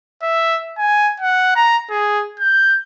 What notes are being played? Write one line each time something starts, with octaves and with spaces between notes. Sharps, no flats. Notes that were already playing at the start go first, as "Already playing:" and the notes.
E5
G#5
F#5
A#5
G#4
G6